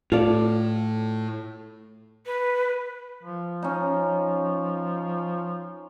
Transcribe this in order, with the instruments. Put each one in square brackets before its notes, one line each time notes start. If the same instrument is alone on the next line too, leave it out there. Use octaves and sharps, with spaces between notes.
[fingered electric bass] A2 [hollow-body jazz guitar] F4 A4 D5
[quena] B4
[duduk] F3
[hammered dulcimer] C#4 D#4